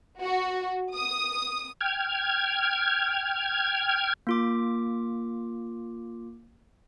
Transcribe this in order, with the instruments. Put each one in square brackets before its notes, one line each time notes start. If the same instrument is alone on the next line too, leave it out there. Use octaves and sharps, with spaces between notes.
[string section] F#4
D#6
[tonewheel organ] G5 F6 G#6
[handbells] A#3 F4 D6